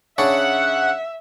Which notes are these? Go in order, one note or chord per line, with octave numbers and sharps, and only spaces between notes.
C#3 C#4 D4 E5 F#5